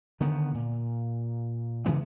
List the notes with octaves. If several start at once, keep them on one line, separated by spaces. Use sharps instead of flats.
D3 D#3 B3
A#2
C#3 E3 G#3 B3